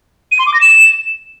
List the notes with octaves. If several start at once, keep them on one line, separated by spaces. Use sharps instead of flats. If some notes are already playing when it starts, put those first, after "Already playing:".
D#7
C6
D6
A#6
E7